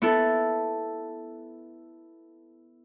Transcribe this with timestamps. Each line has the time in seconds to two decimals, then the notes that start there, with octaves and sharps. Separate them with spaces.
0.02 B3 E4 A4